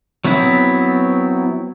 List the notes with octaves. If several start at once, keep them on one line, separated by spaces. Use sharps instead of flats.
F#3 B3 C4 E4